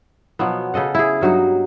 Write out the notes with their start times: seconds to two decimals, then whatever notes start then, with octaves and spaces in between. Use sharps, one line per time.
0.39 B2 F3 F#3 B3
0.74 C#3 A4 D#5 F#5
0.95 E4 G#4
1.21 G2 F#3 D#4 F#4